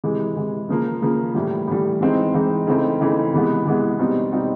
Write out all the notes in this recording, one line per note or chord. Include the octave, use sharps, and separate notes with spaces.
C3 E3 G#3
C3 E3 G#3
C#3 F3 A#3
C#3 F3 A#3
A2 E3 G3
A2 E3 G3
E3 G#3 C4 D#4
E3 G#3 C4 D#4
C#3 E3 A3 C4 D#4
C#3 E3 A3 C4 D#4
C3 E3 G#3 B3
C3 E3 G#3 B3
B2 G3 C4 D#4
B2 G3 C4 D#4